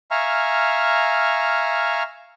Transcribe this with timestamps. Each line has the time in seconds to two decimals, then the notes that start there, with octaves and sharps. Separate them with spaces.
0.11 E5 F5 G#5 A#5 C#6 F6